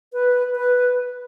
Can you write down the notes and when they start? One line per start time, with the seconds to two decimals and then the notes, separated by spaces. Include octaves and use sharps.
0.13 B4
0.56 B4